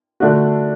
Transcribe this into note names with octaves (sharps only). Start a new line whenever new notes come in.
D3 A3 D4 F#4